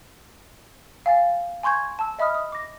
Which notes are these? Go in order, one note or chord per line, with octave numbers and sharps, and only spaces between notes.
F5 G#5 A6
G#5 C6 C#6 G6 G#6
A5 E6
D#5 E5 B5 D#6 F6
D#6
D6 A#6